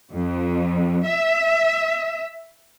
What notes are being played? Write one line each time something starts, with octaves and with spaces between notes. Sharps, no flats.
F2
E5